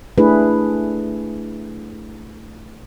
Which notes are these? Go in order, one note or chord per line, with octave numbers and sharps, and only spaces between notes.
A3 D4 E4 G#4 B4